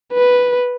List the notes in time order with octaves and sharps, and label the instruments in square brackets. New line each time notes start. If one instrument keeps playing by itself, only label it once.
[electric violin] B4